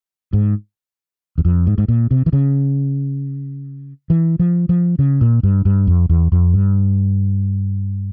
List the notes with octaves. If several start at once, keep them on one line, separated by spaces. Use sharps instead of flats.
G#2
E2
F2
G#2
G#2
A#2
C3
E3
C#3
E3
F3
F3
C#3
A#2
G2
G2
F2
E2
F2
G2